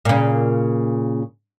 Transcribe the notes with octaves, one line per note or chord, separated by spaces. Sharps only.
A#2 C#3